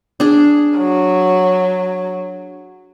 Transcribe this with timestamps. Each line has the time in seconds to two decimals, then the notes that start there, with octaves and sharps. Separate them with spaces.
0.20 D4 G#4
0.77 F#3